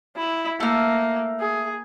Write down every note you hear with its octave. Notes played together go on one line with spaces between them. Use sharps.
E4
A3 A#3 F6
G#4